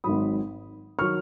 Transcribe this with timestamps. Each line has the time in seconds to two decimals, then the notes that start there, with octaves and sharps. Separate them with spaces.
0.04 G#1 G#2 F#3 B5 D#6
0.99 D#3 F#3 C#6 F6